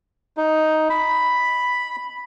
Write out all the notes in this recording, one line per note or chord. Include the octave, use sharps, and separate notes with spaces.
D#4
B5